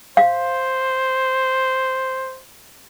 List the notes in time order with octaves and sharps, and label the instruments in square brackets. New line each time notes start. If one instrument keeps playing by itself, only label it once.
[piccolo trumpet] C5 [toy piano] F5